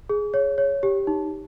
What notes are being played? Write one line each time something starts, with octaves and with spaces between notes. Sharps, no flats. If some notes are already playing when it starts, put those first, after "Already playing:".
G#4
C#5
C#5
G4
D#4